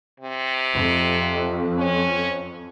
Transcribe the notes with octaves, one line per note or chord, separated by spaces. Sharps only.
C3
F2
C#4